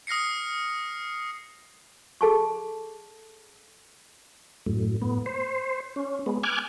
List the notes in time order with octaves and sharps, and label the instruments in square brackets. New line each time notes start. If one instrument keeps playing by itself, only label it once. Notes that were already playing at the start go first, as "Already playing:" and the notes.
[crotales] D#6 F6 A#6 C7 C#7
[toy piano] G#4 A4 A5 C#6
[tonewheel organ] F#2 A2
A2 B3
C5
C#4
G#3 B3
G#5 D6 F6 F#6 G#6